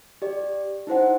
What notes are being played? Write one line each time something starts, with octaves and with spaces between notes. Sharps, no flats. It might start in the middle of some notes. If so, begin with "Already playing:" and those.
G4 D5
D#4 E4 C5 F#5